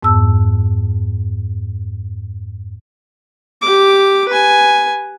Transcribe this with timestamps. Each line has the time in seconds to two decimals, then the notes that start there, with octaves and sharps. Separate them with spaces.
0.03 F2 G#2 B3 A5 E6
3.62 G4 D6
4.28 B4 G#5